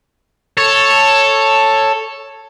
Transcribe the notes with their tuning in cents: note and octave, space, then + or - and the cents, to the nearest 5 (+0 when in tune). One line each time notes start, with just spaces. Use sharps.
A4 +5 C#5 +0